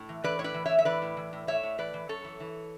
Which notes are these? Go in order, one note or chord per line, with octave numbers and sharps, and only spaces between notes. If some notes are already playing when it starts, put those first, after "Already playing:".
Already playing: A2
E3
E3 B4 D5
A2 C#5
B4 D5
E3
A2 C#5 E5
E5
E3 B4 D5
A2
E3
A2
A2 C#5 E5
A2
E3 B4 D5
E3
F#2 A4 C#5
E3
E3